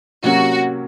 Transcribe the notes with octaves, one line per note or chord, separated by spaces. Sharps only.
C3 F#3 A#3 C#4 F#4